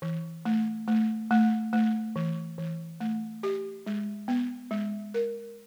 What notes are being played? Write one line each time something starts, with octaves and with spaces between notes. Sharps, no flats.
E3
A3
A3
A3
A3
E3
E3
A3
G4
G#3
B3
G#3
A#4